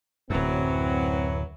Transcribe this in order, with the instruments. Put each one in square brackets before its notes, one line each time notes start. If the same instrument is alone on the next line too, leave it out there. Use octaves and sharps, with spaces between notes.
[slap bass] D1 F#2 [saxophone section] E3 F#3 [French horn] C4